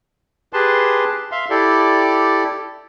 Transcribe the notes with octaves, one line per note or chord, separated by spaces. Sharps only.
G4 G#4 B4 A5 C6
E5 F5 C6
E4 G4 A4 D5